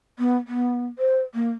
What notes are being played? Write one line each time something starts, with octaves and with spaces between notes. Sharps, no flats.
B3
B3
C5
A#3